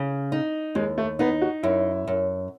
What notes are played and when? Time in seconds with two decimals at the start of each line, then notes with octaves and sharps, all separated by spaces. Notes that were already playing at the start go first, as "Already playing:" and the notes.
Already playing: C#3
0.32 D#4
0.75 D#2 G#3
0.98 A3
1.19 B3 D#4
1.42 F#4
1.63 F#2 E4
2.08 F#2